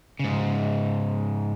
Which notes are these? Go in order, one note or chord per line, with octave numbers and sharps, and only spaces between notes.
G#2 C#3